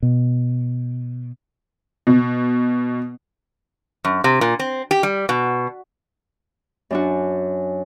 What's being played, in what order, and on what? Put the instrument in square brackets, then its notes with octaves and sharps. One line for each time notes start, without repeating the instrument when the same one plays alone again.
[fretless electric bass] B2
[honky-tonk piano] B2
[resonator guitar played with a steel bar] F#2
C3
A#2
C4
G4
G3
B2
[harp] F#2 D4 F#4